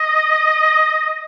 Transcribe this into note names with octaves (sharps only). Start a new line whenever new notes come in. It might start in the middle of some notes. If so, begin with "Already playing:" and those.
Already playing: D#5